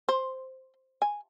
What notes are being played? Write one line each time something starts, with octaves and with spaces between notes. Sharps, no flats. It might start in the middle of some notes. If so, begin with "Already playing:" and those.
C5
G#5